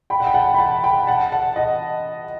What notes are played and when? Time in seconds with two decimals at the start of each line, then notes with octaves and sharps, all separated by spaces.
0.10 G5 B5
0.20 F#5
0.27 G5
0.34 F#5 A5
0.54 B5
0.59 F#5 A5
0.84 G5 B5
1.07 F#5 A5
1.32 F#5 A5
1.56 D#5 F#5